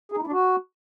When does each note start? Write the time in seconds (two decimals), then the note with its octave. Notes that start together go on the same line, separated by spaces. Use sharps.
0.12 G#4
0.17 D#4
0.22 E4
0.27 D4
0.32 F#4